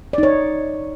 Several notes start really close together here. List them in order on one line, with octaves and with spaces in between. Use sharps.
D5 D#4 C#5